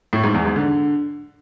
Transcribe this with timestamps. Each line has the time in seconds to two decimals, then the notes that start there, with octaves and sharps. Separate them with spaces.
0.13 A2
0.24 G#2
0.34 E2
0.45 G#2
0.56 D3